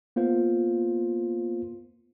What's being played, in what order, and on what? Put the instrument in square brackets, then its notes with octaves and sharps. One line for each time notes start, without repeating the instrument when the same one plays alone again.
[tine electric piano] A#3 B3 F4 C5